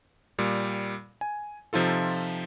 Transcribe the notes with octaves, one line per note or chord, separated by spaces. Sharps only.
A#2 G3
G#5
C3 F3 D#4 F4 A4